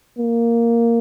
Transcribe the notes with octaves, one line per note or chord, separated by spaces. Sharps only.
A#3